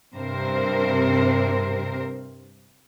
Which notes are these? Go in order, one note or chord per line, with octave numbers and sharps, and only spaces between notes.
G2 C3 C4 A#4 C5